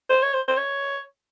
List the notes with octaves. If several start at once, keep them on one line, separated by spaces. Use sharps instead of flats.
C5
C#5
C5
C5
C#5